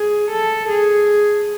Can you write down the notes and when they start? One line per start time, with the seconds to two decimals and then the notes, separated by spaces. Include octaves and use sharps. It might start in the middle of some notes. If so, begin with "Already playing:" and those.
Already playing: G#4
0.31 A4
0.70 G#4